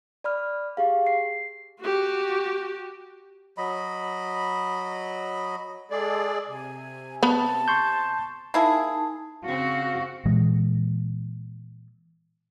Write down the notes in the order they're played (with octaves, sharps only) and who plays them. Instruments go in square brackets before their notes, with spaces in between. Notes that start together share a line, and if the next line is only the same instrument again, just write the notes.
[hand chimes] D5 B5 F6
G4 G#4 F5
C7
[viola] F#4 G4
[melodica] F#3 D#5 B5
[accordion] G#3 G#4 D5 [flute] A4
[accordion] C3 [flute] G#5
[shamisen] B3 B5 [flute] A5
[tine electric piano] C6 C#6 G6
[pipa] A#3 E4 G#4 [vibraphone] D#4 A5
[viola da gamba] C#3 C4 [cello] F#4 [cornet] F5
[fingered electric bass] A#2 E3 G#3